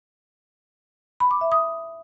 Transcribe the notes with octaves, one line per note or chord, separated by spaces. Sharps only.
B5
D6
E5
D#6